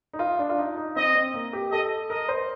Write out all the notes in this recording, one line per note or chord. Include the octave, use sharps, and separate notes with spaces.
D#4
F4
D4
F4
D#4
D#4
C4 D#5
C4
A#3
G4
A4 D#5
A#4 D#5
C5